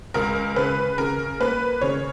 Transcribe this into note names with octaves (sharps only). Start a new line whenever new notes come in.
C#2 A#4
C#3 B4
C#3 A#4
A#3 B4
C#3 C#5